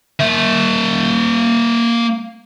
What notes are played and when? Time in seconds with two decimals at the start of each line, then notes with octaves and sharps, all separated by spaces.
0.20 A#3 E5